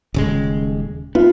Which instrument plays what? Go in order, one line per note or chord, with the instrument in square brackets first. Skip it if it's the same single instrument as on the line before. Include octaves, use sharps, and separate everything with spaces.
[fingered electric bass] D#1 C#3 G#3
[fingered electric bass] B3 [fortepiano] F4